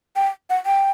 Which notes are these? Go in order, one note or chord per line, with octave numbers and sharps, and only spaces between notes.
G5
F#5
G5